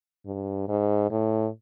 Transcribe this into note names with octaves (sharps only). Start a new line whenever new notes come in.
G2
G#2
A2